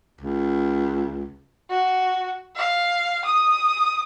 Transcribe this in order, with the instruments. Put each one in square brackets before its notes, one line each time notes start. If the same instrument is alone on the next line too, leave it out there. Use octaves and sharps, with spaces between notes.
[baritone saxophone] C#2
[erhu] F#4
F5
D#6